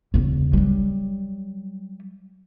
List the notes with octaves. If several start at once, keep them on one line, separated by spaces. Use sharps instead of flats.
E2 C#3
F#3 G3